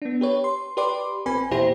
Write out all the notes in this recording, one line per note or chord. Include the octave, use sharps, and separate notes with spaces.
B3 D4
G4 B4 C#5
C6
G4 B4 D5 C6 D6
A1 C4 B4 G#5 B5
E2 A#2 E4 G4 C5 A#6